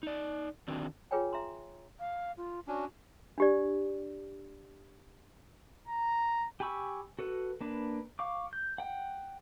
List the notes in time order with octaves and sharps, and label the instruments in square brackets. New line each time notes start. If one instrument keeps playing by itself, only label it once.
[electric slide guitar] D#4 D5
D3 D#3 C4 D4 F#4
[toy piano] F4 G#4 B4 C#5 G5 G#5
E5 A#5 C6
[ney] F5
F4
[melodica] C#4 D4 [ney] F#4
[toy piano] D4 G4 D5
[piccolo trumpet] A#5
[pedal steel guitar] G4 G#5 B5 C#6 E6
F#4 A4 B4
A#3 D4 B4
F5 C#6 D6
G6
F#5 G5